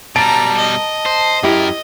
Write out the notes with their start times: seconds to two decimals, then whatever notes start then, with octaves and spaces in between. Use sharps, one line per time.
0.16 B2 G3 A5 A#5 D7
0.58 D#5
1.06 C5
1.43 F#2 E4 G4 A#4